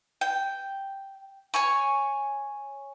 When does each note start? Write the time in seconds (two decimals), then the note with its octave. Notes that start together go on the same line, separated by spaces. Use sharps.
0.21 G5
1.54 C#5 G#5 C#6